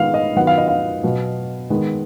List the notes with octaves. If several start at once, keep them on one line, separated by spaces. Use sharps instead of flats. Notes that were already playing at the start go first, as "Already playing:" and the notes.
Already playing: D#3 G#3 B3 F5
D#5
D#3 F#3 B3 F#5
F5
D#5
F5
B2 F#3 B3
D#3 G#3 B3